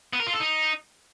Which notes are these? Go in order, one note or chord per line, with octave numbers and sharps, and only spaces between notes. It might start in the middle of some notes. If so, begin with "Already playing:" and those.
B3
A#4
F4
A4
D#4